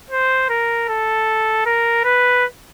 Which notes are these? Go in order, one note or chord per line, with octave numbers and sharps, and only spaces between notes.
C5
A#4
A4
A#4
B4